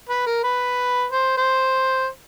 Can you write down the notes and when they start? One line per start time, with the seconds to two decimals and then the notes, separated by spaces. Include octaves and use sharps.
0.09 B4
0.26 A#4
0.44 B4
1.12 C5
1.38 C5